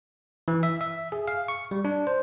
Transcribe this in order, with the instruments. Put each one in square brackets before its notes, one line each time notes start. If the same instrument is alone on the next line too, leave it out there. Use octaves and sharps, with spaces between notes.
[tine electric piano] E3
E5
E5
G#4
F5
C#6
G3
D4
C5